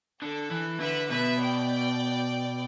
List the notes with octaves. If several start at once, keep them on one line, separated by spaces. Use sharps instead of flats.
D3 A4
E3
D3 B4 E5
B2 B4 E5
D5 G5